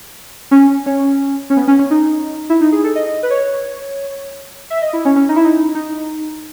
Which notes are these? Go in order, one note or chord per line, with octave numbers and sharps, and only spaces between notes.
C#4
C#4
C#4
B3
C#4
C#4
D#4
E4
D#4
G#4
A4
D#5
B4
C#5
E5
D#5
E4
C#4
C#4
D#4
E4
D#4
D#4